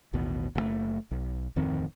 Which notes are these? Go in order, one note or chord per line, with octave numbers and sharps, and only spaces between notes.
A1 D#2 B2
F#1 B2 A3
B1
D1 F2 D#3 C4